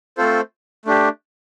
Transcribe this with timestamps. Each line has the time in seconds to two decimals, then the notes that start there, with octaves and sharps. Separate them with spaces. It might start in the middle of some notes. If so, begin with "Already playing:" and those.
0.18 A3 C4 F4 A4 C5
0.85 A3 D4 G4